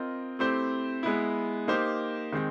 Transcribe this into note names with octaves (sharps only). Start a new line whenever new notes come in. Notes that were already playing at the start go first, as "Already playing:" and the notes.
Already playing: C4 F4 A#4 D#5
A3 C4 E4 G4 C5
G#3 B3 E4
A#3 D#4 G4 C5
D#3 G#3 C4